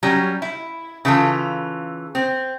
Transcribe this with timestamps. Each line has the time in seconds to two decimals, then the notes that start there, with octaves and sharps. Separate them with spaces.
0.03 F#3 G3 C#4
0.42 E4
1.05 C#3 E3 F4 A4
2.15 C4